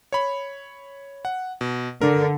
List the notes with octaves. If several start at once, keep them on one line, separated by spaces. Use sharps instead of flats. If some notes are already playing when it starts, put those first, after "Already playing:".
C#5 B5
F#5
B2
D3 A#4